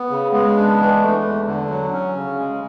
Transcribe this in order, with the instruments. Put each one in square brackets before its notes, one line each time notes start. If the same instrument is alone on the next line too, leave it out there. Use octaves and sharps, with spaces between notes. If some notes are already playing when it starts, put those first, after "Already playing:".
Already playing: [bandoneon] B3
C#3
[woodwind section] G#3 [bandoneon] B3
[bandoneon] D4
E3
A3
E2
D3
F#3
C#4
C#3
G#3